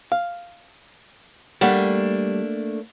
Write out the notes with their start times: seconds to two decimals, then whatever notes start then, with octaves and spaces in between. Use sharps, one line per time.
0.12 F5
1.61 G3 A3 A#3 D4 F#5